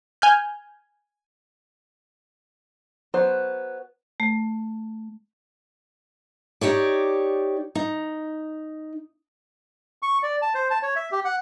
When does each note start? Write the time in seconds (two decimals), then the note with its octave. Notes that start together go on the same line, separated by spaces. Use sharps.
0.22 G#5 F6 G6
3.14 F#3 B3 C5
4.20 A3
6.61 D#4 G4 C#5 D5
7.75 D#4
10.02 C#6
10.23 D5
10.42 A5
10.54 C5
10.70 A5
10.82 C#5
10.96 E5
11.12 G4
11.25 F#5